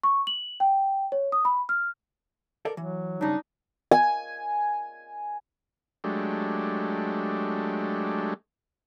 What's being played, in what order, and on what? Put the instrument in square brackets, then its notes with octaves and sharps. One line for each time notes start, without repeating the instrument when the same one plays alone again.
[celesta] C#6
F#7
G5
C#5
D#6
B5
F6
[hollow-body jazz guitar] A4 A#4 D5
[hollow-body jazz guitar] E3 [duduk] F#3
[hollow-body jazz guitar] G2 C#3 [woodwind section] D4 D#4
[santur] G#5
[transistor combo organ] F#3 G#3 A3 D4 G4